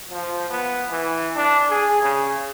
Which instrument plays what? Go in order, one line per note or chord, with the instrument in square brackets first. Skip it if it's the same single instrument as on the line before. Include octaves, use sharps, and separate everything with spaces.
[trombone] F3
B3
E3
D4
G#4
C#3